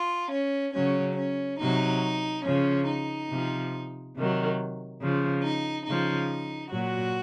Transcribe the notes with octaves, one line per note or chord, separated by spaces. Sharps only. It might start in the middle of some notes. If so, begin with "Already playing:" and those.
Already playing: F4
C#4
C#3 F#3 C#4
C#4
C3 F#3 D#4
C#3 F3 C#4
D#4
C3 F3
C3 D#3 F#3
C#3 F3
D#4
C#3 F3 D#4
A#2 F#3 F#4